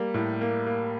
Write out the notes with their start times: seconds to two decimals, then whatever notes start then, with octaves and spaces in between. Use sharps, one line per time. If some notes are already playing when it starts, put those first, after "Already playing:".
Already playing: G3 A#3
0.14 A2
0.41 A#3
0.66 A#3